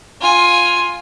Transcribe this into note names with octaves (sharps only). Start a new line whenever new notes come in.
F4 G#5